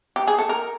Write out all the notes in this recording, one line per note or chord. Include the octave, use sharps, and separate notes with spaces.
G4
G#4
A4
A#4